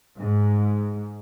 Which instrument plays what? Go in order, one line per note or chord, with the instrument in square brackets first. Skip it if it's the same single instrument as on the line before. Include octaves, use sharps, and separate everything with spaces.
[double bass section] G#2